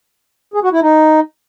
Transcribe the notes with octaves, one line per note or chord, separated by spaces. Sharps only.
G#4
F#4
E4
D#4